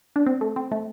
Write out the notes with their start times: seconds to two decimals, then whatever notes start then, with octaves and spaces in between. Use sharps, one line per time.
0.16 D4
0.26 C4
0.41 A3
0.56 C4
0.72 A3